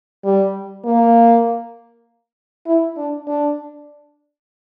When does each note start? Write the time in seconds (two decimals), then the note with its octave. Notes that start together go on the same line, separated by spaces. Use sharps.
0.24 G3
0.85 A#3
2.66 E4
2.97 D4
3.27 D4